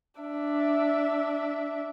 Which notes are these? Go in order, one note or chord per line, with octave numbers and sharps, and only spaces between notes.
D4 E5